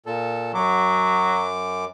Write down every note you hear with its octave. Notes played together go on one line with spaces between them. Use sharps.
A#2 A4
F#2 F#3 D6